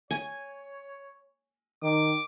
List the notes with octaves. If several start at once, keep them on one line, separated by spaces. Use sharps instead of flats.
C#5 G#5
D#3 D6